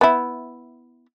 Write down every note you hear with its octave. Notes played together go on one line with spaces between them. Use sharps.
B3 E4